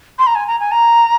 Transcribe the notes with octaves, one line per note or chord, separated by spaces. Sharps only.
C6
A#5
G#5
A#5
G#5
A#5